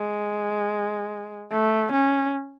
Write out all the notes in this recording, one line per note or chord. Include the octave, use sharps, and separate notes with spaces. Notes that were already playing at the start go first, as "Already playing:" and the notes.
Already playing: G#3
A3
C#4